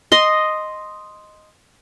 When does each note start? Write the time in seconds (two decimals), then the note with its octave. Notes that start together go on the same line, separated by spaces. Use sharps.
0.12 D#5 C6